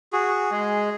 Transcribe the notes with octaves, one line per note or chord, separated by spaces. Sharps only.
F#4 G#4
G#3